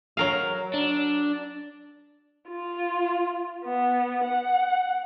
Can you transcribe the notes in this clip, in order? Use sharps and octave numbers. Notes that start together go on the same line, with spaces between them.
F#3 A#4 F5
D4
F4
B3
F#5